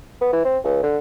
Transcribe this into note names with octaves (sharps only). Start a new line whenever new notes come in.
B3
E3
C4
C#2
D3